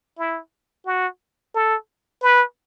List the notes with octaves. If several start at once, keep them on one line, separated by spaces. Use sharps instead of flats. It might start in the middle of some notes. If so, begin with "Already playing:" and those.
E4
F#4
A4
B4